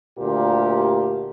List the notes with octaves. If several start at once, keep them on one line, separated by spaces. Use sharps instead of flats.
D2 A#2 A#3 G4